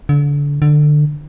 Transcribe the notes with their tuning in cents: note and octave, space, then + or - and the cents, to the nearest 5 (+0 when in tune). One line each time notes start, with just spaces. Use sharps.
D3 -30
D3 +20